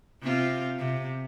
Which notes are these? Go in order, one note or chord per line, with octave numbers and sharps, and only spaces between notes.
C3 C4 F4
C3